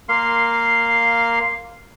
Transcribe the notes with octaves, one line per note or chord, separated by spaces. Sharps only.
A#3 F5 C6